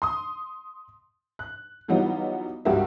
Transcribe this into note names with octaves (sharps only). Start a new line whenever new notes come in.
C6 D#6
F#6
E3 F#3 G3 B3 D#4 F4
C#2 G2 F#4 G4 A#4 E5